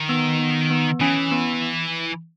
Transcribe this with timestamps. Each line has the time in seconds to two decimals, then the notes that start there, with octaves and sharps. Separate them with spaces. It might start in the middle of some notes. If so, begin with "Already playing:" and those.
Already playing: D#3
0.09 B3
0.39 B3
0.71 B3
1.01 E3 C#4
1.32 B3